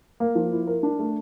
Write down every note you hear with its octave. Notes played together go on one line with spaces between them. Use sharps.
A#3
F3
E4
A#4
D4
A3